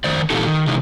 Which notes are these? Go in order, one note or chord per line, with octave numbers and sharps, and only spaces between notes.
F2 D#3 C5 D5
A#2 E3 D#4 G4 A4
D#3
C3 E3 G#3 D#4